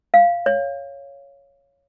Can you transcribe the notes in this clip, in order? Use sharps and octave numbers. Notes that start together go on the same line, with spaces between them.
F5
C#5